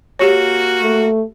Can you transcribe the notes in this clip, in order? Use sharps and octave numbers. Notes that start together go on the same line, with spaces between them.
A#3 F#4 G4 C#5
A3